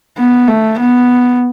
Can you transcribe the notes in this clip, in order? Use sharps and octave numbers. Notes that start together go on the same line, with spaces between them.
B3
A3
B3